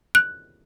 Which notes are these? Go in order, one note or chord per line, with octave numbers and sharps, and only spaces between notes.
F#6